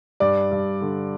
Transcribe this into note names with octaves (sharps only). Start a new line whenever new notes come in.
G2 D5
G2
D3